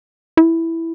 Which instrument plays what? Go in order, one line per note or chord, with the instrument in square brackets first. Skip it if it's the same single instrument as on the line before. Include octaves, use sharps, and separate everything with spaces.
[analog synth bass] E4